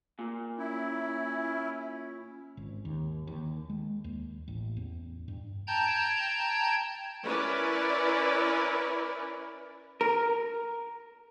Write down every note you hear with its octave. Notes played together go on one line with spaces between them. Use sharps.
A#2
C#4 E4
G#1
D#2
D#2
G#3
D#2
A1
E2
G2
G5 A5 A#5 G6 G#6
C#4 E4 A#4 B4 D5
A#4